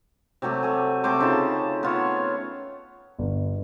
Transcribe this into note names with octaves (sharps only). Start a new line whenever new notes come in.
C3 F#3 A3 G4
A3 G#5
C3 A3 C5 D6
C#3 D#4 F4 A5
B3 F4 C#5
G1